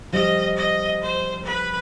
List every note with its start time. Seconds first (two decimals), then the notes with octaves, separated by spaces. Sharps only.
0.13 F3 G3 D#5
0.56 D#5
1.02 C5
1.45 B4